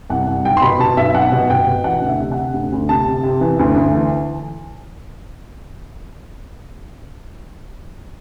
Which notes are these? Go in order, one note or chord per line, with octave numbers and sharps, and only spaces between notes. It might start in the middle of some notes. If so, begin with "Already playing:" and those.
C2 F#5
C2
B1 G5
C6
B2 B5
B2 A5
B1 E5
B1 F#5
B2
B2 G5
B2
E3 F#5
D2
E5
C3
F#5
C3
D2
D2
C3 A5
C3
C3
E3
D2
D2
E3